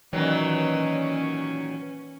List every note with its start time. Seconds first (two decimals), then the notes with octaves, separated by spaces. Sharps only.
0.13 A#2 D#3 E3 F#3 C#4